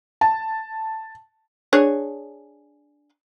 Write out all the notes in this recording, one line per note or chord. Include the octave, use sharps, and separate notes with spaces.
A5
D4 G#4 C#5